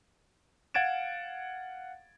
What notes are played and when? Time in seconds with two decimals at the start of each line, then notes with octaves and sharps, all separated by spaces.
0.74 F5 F#5 G#6 A6 D7 E7